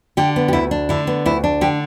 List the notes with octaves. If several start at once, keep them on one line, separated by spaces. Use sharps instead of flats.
D3 G4
B3
G4
D2 E4
D4
D3 E4
B3
D2 E4
D4
D3 G4